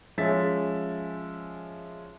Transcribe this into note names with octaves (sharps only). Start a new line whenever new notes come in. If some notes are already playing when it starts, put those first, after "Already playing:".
F3 G#3 C#4 E5 A6 B6